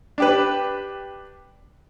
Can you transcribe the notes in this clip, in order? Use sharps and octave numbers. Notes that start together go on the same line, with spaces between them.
D4 G4 B4